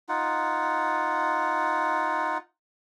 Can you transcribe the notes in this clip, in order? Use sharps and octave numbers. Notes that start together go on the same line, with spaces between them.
D#4 F4 F#5